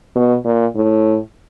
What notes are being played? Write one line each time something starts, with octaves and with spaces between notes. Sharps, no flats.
B2
A#2
A2